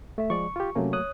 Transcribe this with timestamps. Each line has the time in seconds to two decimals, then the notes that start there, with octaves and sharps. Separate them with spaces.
0.18 A3 E5
0.30 F3 G#3 D5 C#6
0.56 F4 G4
0.75 C3 F#3 A3 A#3 C#4
0.93 C#5 D#6 F#6